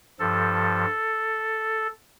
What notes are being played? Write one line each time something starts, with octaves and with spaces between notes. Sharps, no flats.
G2 F3 A4